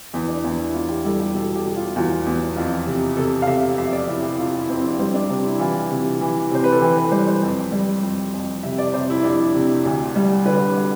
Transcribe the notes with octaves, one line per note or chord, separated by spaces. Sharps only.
E2
D4
E2 E4
E4
E2 F4
G4
G3 A4
G4
B2 A4
G4
B2
F4
E2 F4
E2
F2 F4
C3
C3 A4
F5
C3 E5
F2 E5
D5
C3 E4
G4
C3 F4
E4
F2 C4
D4
G3 C4
D4
C3 C4
E4
E3 F4
C3
E3
C3 C5
B4
A4
E3 G4
B4
G3 C5
C5
F2
G3
F2
F2
C3 E5
D5
C3 C5
E4
F2 D4
C3
D2
G3
D3 B4
G3